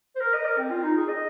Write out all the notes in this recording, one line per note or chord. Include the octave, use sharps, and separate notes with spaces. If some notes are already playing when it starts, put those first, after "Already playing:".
C5
A#4
D#5
A#4
C4
F4
D#4
G#4
D#5